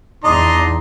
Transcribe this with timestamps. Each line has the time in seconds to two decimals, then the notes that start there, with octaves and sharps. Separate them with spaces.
0.24 E2 D4 D#4 D#5 A#5 C6